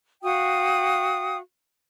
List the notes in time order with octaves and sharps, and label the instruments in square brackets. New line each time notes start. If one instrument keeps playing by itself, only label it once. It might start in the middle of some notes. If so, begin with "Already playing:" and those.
[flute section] F#4 F5 G5 D#6